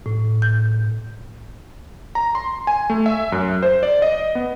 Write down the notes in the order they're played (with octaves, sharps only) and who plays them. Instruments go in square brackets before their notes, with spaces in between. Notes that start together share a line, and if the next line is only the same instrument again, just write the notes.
[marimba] A2
G6
[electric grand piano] A#5
C6
G#5
A3
E5
F#2
C5
D5
D#5
B3